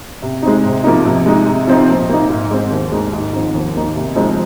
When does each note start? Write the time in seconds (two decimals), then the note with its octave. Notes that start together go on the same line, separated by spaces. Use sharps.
0.22 C3
0.43 G#3 C4 D#4
0.64 C3
0.84 F3 A#3 D#4
1.05 C3
1.26 G#3 D#4
1.47 C3
1.67 F3 C4 D#4
1.88 A#2
2.09 A#3 D#4
2.30 G#2
2.51 G#3 C4
2.71 D#2
2.92 D#3 G#3 D#4
3.13 G#2
3.33 F3 C4 D#4
3.54 D#2
3.74 D#3 A#3 D#4
3.96 C3
4.15 F3 G#3 C4 D#4